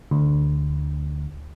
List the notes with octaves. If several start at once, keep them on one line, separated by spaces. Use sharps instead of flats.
D2